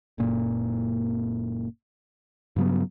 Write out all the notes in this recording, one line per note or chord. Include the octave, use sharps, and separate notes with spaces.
F#1 A#2
G2 C#3 F#3 B3